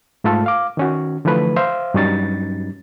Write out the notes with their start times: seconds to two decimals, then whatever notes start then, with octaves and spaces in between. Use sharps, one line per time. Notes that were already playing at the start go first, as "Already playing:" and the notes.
0.24 G#2 A3 F4 A4
0.46 F5 D6
0.77 D#3 C#4 F#4
1.25 D3 E3 F3 A3 B4
1.56 C5 E5 F5
1.94 G2 F#3 G3 C#4 D#4 A6